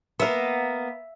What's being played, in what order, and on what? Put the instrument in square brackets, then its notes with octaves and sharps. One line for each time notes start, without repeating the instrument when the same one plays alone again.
[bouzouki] A#3 B3 [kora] E5 F5